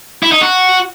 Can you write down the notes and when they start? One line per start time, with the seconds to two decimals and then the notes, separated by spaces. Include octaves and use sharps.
0.23 E4
0.32 D#4
0.41 F#4